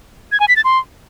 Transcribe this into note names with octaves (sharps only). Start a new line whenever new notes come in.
G#6
G#5
B6
A6
C6